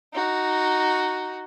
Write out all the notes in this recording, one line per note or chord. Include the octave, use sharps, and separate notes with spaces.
D#4 F#4